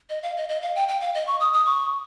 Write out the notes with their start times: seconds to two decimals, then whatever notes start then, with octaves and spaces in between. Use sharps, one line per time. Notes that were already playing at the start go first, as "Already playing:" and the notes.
0.10 D#5
0.23 F5
0.37 D#5
0.49 D#5
0.62 F5
0.76 G5
0.88 G5
1.01 F5
1.15 D#5
1.27 C#6
1.40 D#6
1.53 D#6
1.66 C#6